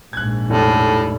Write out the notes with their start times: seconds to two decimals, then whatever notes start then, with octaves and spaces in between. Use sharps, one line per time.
0.13 A#1 G#2 F#6 G#6
0.50 F1 A2